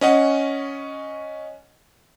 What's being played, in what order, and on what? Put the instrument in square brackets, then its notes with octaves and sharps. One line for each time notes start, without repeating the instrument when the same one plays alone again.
[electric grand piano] C#4 D#5 F#5